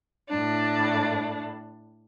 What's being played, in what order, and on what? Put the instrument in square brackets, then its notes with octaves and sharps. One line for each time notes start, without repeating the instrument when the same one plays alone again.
[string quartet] A2 D4